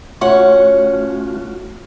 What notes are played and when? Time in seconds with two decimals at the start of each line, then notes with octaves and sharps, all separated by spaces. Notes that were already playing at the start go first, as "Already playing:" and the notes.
0.21 A3 C#4 F4 F#4 F#5